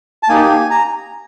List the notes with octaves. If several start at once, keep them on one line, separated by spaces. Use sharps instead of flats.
A5
A#3 D#4 G4 G#5
A#5